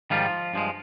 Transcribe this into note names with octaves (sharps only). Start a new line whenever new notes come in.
G#2 D#3 F3 G3 F4
G2 F3 G#3